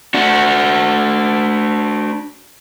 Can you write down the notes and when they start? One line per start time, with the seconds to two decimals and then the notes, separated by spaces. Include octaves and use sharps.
0.14 D4 F#4